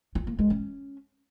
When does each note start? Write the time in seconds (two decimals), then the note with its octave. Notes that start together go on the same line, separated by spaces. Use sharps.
0.15 F4
0.27 A#3
0.39 G#3
0.50 C#4